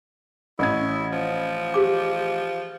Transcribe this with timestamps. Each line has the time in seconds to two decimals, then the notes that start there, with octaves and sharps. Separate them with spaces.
0.59 A1 C#4 E4 G#6
1.12 F3
1.74 G4 G#4 D6